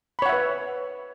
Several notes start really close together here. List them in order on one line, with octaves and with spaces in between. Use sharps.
B5 C#5 F#5 E5 B4